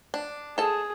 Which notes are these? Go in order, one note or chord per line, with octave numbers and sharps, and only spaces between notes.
D4
G#4 A4 A5